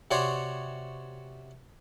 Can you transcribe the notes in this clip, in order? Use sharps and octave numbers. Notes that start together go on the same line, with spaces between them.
C3 F#4 C#5 D5 C6